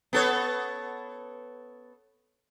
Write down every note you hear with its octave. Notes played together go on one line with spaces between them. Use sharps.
B3 A4 C#5